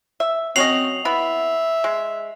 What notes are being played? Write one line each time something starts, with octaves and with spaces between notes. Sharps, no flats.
E5
F#3 C4 C#4 D#5 C7 F7 F#7
B3 E4 E5 B5
G#3